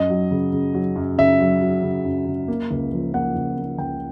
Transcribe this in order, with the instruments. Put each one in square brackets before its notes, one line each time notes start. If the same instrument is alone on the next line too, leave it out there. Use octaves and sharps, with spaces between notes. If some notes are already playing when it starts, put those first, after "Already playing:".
Already playing: [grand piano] F#2 D#5
F#3
C#3
C#3
F#3
F#2
C#3 E5
F#3
F#3
C#3
F#2
C#3
A#3
C#2
F3
A#3 F#5
C#2
A#3
C#2 G5